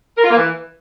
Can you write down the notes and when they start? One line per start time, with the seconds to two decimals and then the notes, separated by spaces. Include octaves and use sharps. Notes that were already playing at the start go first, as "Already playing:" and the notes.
0.18 A#4
0.24 F4
0.30 A#3
0.37 E3